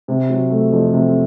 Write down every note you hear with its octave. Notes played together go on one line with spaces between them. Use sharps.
C3
F#3
A3
F2
C3